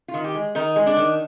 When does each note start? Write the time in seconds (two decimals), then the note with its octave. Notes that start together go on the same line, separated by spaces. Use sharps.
0.08 F4
0.14 D#3
0.24 G4
0.34 G#3
0.55 D#3 D#4
0.76 G#3
0.86 D4
0.97 D#3